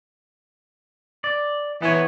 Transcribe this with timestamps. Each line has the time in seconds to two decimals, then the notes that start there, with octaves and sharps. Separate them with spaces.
1.24 D5
1.82 E3 B3 C#5